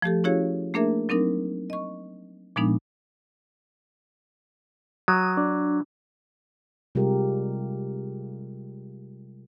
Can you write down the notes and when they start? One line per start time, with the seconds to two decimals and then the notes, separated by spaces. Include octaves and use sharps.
0.02 F3 A3 G4 A4
0.24 C#4 E4 F#4 G#4 C#5 F5
0.74 A3 A#3 D4 G#4 A#4 E5
1.09 F#3 C4 D4 D#4 A#4
1.70 D#5 C#6
2.56 A#2 F3 G#3 B3 D4 D#4
5.08 F#3 D#6
5.37 D4
6.95 C3 G3 G#3 F4 G4 A#4